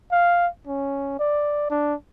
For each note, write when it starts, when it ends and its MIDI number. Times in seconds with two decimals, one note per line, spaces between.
0.12 0.48 77
0.67 1.18 61
1.19 1.70 74
1.70 1.95 62